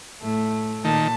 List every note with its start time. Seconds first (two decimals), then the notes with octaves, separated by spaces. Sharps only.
0.22 A2 A3
0.85 A#2 D#3 A5